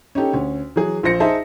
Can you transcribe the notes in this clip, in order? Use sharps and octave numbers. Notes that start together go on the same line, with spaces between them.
C#4 D#4 G4 A4
D2 C#4
E3 F#3 G#4
A#1 F4 C5 A#6 C#7
D#4 G#4 C5 E5 A5